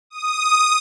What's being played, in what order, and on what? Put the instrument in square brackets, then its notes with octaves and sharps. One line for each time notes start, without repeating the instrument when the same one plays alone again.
[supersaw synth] D#6